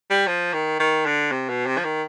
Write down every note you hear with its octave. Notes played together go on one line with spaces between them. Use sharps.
G3
F3
D#3
D#3
D3
C3
B2
C3
F3
D#3